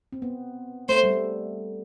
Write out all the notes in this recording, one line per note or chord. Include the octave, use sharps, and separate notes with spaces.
C4
B3
A3 C5
G3